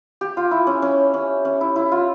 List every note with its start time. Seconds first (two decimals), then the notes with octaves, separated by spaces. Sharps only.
0.21 G4
0.37 F4
0.51 E4
0.67 C#4
0.82 C#4
1.14 C#4
1.45 C#4
1.61 E4
1.76 E4
1.91 F4